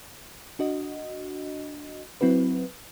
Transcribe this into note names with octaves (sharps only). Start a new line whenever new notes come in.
D4 F#4 D#5
F#3 C4 E4 F#4 B4